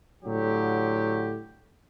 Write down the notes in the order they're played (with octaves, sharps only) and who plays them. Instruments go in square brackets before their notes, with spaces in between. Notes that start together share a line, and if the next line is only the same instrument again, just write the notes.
[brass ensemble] A2 D3 F#3 G4